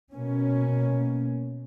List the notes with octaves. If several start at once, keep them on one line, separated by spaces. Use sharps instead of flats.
B2 A#3 C#4